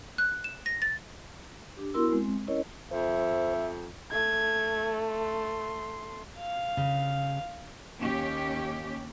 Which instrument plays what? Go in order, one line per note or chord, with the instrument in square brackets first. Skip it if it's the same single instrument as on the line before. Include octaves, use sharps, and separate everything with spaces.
[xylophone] F#6
E7
A#6
A6
[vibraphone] D4 G4
B3 E4 F#4 A#4 C6 E6
G#3 C4
C#4 E4 A#4 C#5 D#5
[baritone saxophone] F2 [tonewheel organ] C5 [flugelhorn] E5
[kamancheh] A3 [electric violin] G#6
[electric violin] C6
[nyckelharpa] F5
[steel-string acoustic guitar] C#3
[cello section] D#2 C#4 G4